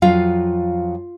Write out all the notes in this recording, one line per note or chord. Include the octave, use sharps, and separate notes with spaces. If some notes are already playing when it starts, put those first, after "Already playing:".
F2 C#3 F#3 F4 F5